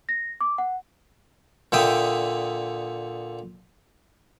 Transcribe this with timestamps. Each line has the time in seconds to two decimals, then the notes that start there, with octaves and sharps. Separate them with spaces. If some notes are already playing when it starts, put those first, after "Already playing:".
0.09 A#6
0.41 D6
0.58 F#5
1.72 A#2 D3 E5 G5 D#6